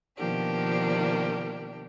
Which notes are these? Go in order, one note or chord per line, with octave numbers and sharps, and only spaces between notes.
B2 D#3 F3 A#3 D4 G4